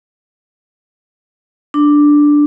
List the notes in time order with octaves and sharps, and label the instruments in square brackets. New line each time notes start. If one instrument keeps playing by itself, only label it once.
[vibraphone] D4